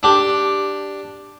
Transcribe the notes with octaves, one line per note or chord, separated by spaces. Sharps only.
D4 G4